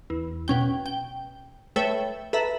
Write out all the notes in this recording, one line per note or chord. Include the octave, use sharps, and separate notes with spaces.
E2
B2 C#4 G5
G5
A3 A4 B4 C#5 E5 G5
A4 B4 E5 A#5